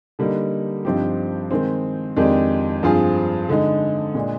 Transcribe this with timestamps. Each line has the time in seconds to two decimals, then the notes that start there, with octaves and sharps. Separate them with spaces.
0.19 D3 G3 A#3 D#4
0.85 G2 F3 C4 D#4 G4
1.51 D#3 G#3 C4
2.16 F2 D#3 G#3 D4 G4
2.83 G2 F3 C4 F4 G#4
3.49 D3 G#3 D#4
4.15 A#2 G#3 D4